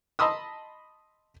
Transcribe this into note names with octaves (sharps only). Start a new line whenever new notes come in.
D#5 A5 B5 C6 D#6 E6